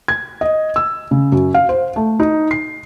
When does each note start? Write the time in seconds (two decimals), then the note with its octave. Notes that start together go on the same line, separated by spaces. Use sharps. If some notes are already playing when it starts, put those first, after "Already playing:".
0.08 G#6
0.41 D#5
0.76 E6
1.11 C#3
1.32 F#2
1.54 F5
1.69 C5
1.96 A3
2.20 D#4
2.51 C7